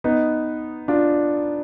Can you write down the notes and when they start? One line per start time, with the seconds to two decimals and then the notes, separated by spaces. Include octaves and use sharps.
0.04 B3 D#4
0.88 D4 F4